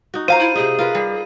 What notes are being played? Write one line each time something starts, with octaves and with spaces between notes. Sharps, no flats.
D#4 F#4
F4 C5 F5 A#5 D#7
E4
C3 D#4 G#4
F4 A#4 B4
G3